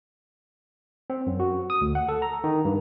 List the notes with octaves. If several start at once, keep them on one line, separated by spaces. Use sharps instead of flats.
C4
F#2
F#4
D#6
D2
F#5
A4
A#5
D#3
G2